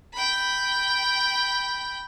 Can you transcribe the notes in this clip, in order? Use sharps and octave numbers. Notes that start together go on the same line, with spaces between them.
G5 B5